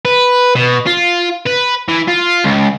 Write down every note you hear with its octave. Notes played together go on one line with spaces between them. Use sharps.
B4
B2
F4
B4
E3
F4
C#2